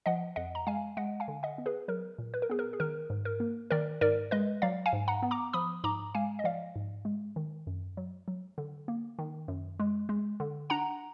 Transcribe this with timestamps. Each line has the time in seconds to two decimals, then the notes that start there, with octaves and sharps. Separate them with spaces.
0.06 F3 D#5 F#5
0.36 F2 D#5 F#5
0.55 A#5
0.67 G#3 F5 G#5
0.97 G#3 D#5 F#5
1.20 F5 G#5
1.28 D3
1.43 D#5 F#5
1.58 B3
1.66 G#4 B4
1.88 F#3 A#4
2.18 A#2
2.34 B4
2.42 A#4
2.50 B3 G#4
2.59 A#4
2.73 G#4
2.80 D#3 A#4
3.10 G#2
3.25 A#4
3.40 A#3
3.71 D#3 A#4 D5
4.01 G#2 A#4 D5
4.31 G#3 B4 D#5
4.62 F#3 D5 F5
4.86 F5 G#5
4.93 G#2
5.08 F#5 A#5
5.22 B3
5.31 A#5 D6
5.53 F3 B5 D#6
5.84 G#2 A#5 D6
6.14 G#3 F5 G#5
6.39 D#5
6.44 F3 D5 F5
6.76 G#2
7.05 G#3
7.36 D#3
7.67 F#2
7.97 F#3
8.28 F#3
8.58 D3
8.88 A#3
9.19 D#3
9.48 F#2
9.80 G#3
10.09 G#3
10.40 D3
10.70 D4 F#5 A#5